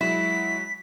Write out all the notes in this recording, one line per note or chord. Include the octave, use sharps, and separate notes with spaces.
F#3 G#3 E4 B6